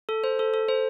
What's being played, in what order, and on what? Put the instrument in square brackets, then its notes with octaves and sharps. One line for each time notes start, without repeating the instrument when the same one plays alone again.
[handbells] A4
C5
A4
A4
C5